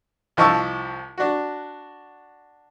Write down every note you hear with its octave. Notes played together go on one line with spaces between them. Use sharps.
C2 F3 D#5 A5 C#6 E6
D4 F#4